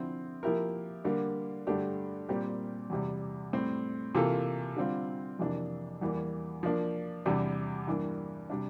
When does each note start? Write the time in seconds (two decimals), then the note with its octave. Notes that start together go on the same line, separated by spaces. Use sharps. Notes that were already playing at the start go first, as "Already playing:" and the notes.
Already playing: D3 F3 C4 E4
0.43 F3 A#3 E4 G4 A#4
1.05 D3 G3 A#3
1.67 G2 D3 A3 D4 G4
2.29 A#2 G3 C4 G4 A#4
2.90 E2 C3 G3
3.53 A2 G3 C4
4.15 C3 E3 A#3 F4 A4
4.77 D3 G3 C4 F4
5.39 F2 C3 E3 A#3 D4
6.01 E2 E3 G3 A#3
6.63 F3 A#3 D4
7.26 E2 C3 G3 D4
7.87 G2 E3 A#3 D4
8.50 C3 G3 D4